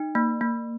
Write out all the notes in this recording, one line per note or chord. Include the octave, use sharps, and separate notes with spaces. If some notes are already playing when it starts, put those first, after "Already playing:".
Already playing: D#4
A#3
A#3